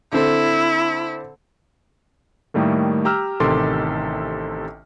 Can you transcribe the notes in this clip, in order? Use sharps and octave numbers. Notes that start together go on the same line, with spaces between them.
D3 C4 E4 A4
A2 D#3 G3 A3 A#3
G4 A#5 E6 F6
A1 C3 D#3 A4 C6 D6